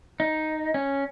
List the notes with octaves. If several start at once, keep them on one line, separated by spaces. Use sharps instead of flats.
D#4
C#4